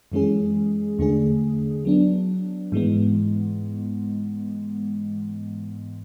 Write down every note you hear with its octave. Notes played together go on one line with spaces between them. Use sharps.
F#2 E3 G#3 C#4 G#4
E2 D3 A3 D4 G#4
F#3 B3 D4
G#2 E3 G#3 B3